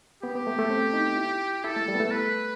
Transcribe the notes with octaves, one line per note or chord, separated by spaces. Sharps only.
B3 G4
B3
A3
A3
C4
D#4
E4
E4 A4
A3
G3
B3
A3
B4